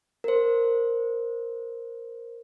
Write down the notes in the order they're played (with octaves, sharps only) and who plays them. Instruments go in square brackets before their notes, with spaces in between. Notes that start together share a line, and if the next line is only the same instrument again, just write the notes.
[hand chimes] A#4 C5